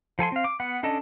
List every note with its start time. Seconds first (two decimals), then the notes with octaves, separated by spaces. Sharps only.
0.19 F3 A4 G#5 C6
0.32 C4 F5
0.44 D6
0.60 B3 F#5
0.83 C#4 D4 A4 D#5 A5